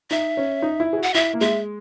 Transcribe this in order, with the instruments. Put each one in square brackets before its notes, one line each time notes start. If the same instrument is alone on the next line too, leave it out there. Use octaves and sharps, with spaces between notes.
[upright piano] D#4 [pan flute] E5
[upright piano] C#4
D#4
E4
G#4
F#4
[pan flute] F#5
[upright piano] E4 [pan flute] E5
[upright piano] A#3
[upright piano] G#3 [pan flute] E5